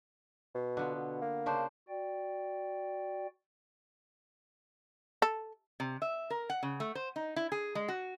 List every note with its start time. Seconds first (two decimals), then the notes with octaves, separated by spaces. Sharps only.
0.54 B2
0.77 D3 B3 F4
0.95 B2
1.21 A#3
1.46 C#3 D4 C5
1.88 F#4 D5 G5
5.22 A4
5.80 C3
6.02 E5
6.30 A#4
6.50 F#5
6.63 C#3
6.80 A3
6.95 C5
7.16 D#4
7.36 E4
7.52 G#4
7.75 G#3
7.88 F#4